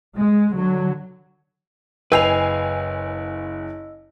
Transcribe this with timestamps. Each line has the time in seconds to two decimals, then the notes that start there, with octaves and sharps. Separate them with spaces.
0.15 G#3
0.53 D3 F#3
2.12 F#1 B4 D#5 G5 G#5 E6 C7 F7